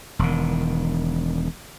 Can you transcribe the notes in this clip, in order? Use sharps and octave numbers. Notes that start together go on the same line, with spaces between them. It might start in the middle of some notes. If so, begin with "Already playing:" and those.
E1 D#3